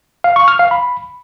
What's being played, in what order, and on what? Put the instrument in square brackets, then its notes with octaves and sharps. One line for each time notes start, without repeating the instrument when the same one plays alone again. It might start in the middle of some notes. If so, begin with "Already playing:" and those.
[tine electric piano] F5
C#6
F6
F5
B5